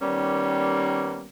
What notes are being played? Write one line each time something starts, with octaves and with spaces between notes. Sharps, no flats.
D#3 G3 A#3 B3 C#4